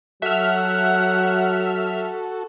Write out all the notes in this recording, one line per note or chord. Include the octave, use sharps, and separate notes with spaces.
F#3 F#4 A4 E5 F#5 F6